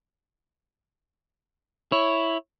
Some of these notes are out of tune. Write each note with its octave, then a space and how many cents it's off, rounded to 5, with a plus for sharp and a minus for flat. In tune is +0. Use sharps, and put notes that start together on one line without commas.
E4 +0 C#5 +0